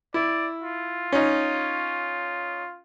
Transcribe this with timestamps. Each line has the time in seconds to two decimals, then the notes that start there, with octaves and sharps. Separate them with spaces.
0.14 E4 D5
0.61 F4
1.12 C#4 D#4